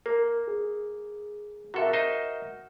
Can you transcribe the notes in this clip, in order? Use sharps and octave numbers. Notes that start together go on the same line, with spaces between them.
A#3 A#4
G#4
C3 F#4 A4 A#4 E5
D#4 C5 D#5